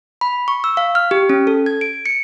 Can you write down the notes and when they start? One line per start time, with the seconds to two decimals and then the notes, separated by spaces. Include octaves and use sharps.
0.21 B5
0.48 C#6
0.64 E6
0.77 F5
0.95 F6
1.11 G4
1.29 C#4
1.47 A4
1.66 G#6
1.81 D7
2.06 C#7